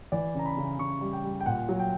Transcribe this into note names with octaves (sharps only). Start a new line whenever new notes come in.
E3 D5
C#3 A#5
B5
C#3
C#3 C#6
G3
G5
G3
G5
A#2 F#5
F#3
G5